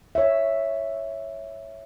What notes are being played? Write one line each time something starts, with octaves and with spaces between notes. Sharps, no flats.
C#5 E5